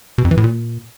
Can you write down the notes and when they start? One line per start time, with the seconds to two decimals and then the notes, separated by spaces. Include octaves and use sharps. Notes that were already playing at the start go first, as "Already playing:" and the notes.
0.18 B2
0.25 F2
0.31 E3
0.37 A2
0.44 A#2